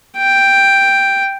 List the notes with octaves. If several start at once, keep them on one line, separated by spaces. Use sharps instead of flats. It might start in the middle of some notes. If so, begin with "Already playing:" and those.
G5